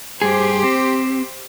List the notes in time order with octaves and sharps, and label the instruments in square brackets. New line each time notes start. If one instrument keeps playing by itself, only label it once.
[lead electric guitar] G2 G#4 [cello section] G4 C5
[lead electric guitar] C4